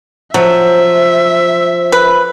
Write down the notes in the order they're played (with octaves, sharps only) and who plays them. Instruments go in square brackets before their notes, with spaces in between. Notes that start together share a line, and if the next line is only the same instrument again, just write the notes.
[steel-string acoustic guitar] F3 [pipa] F#3 [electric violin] E5
[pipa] B4